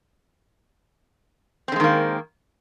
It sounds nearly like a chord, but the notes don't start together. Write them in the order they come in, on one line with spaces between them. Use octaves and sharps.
C4 D3 G#3 D#3 A#3